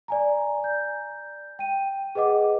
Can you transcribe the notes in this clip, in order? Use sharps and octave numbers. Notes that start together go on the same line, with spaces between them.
D5 G#5 A#5
G6
G5 D#7
G#4 B4 D#5 F#5 D6